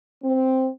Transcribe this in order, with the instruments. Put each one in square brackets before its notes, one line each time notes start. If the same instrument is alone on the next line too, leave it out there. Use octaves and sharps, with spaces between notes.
[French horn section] C4